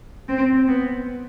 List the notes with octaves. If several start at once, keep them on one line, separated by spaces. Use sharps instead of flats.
C4
B3